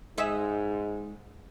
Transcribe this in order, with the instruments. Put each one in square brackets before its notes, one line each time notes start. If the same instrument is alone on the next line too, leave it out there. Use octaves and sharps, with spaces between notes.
[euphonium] G#2 [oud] G#3 D#4 E5